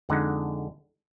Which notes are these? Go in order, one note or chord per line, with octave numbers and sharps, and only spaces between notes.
F2 D3 G#3 D#4 F#5